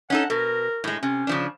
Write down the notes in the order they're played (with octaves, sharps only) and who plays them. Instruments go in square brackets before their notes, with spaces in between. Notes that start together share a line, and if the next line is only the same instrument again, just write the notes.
[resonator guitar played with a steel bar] C#4 D#4 A4 [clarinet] F#5
[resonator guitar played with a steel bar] B2 [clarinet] A#4
[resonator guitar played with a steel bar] A2 G#3
[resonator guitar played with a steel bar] C3 [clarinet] C#4
[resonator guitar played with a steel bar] C#3 F3 D4